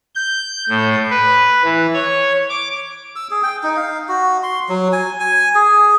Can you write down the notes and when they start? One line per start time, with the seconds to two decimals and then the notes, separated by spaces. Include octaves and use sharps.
0.15 G6
0.69 A2
1.10 B4
1.64 E3
1.94 C#5
2.49 D6
3.16 E6
3.31 G#4
3.43 G5
3.63 D#4
3.77 F5
4.09 F#4
4.43 C6
4.69 F#3
4.93 G#5
5.20 G#5
5.55 G#4